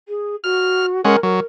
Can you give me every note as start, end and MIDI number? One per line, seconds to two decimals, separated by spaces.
0.08 0.36 68
0.44 1.01 66
0.44 0.86 89
1.05 1.16 56
1.05 1.16 61
1.05 1.22 70
1.05 1.16 78
1.23 1.40 54
1.23 1.44 70